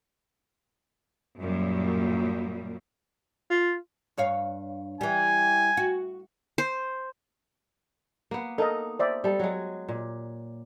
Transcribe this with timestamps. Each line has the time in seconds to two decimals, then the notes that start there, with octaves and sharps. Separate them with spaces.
1.39 F#2 A#2 G3
3.50 F4
4.18 G2 C#5 F5
5.01 E3 G3 G#5
5.77 F#4
6.58 C5
8.31 A#3 B3
8.58 D#4 A4 A#4 D#5
8.99 C5 D5 E5
9.24 G3 A4
9.40 F#3 G#3
9.88 A#2